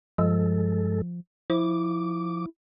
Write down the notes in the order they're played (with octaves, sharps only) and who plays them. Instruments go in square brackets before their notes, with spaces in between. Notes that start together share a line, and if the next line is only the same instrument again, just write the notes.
[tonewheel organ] G2 G#3 A4 [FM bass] F3
[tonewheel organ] F3 D6 [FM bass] E4